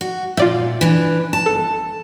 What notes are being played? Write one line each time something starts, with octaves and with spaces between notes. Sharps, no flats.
F#4
A#2 F4 D5 E5
E3 D4
A5
G1 A4